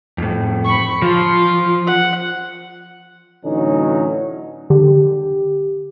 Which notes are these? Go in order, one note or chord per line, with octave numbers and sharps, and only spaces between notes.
F2 A2
B5 C#6
F3 F4
F#5
A2 D3 E3 F#3 C#4 D#4
D3 G4